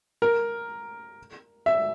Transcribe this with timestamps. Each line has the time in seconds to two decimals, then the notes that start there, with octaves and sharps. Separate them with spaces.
0.22 A#4
1.66 E5